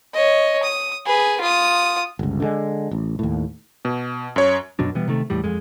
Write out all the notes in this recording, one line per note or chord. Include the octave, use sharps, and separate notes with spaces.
C#5 D#5
D#6
G#4 B4
F4 D#6
G1 C#2
D3 D#3 G#3
A1
D#2 A2
B2
F#2 C#5
F#2 B2 F#3 D4
B2 E3 G3 B3
C3 D#3 A3
A1 E2 A2 G3
F2 G#3